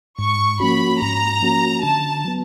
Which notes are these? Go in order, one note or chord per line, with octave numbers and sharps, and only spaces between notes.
G#2 C#6
F3 A#3 C#4 F#4 B5
G#2 A#5
F3 A#3 C#4 F#4
D3 A5
F#3 B3